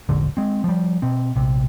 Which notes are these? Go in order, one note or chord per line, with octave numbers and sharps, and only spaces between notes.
E1 A#1 G#2 D3
G#3 C4
F3 G3
B2 C4
A#1 C3